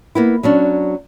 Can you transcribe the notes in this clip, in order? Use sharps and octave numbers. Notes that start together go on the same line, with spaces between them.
A#3 B3 E4
F#3 C#4 D4